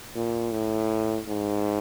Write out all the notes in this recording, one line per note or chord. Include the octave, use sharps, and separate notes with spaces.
A#2
A2
G#2